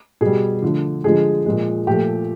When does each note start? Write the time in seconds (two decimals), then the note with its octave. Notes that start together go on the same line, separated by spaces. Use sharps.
0.21 B2 G3 G#4
0.62 D3 F3 A3
1.04 D3 F3 G#3 G#4
1.46 A#2 F3 G#3
1.87 A#2 F3 A3 G4